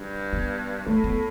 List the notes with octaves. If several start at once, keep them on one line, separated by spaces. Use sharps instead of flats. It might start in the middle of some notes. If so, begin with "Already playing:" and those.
Already playing: G2
B3
A2 A3
B3